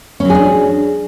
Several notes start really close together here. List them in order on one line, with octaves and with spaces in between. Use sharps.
C#4 F#3 G#4 D4